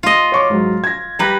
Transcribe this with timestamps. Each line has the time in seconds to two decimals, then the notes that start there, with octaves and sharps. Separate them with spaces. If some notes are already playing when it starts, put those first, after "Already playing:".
0.03 F4 D#5
0.32 C#5 C#6 D6
0.50 G#2 F#3
0.84 G#6 A#6
1.19 G3 B4 A#5 F#6 A#6